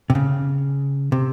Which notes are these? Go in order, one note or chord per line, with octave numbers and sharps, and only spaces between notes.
C3
C#3
C3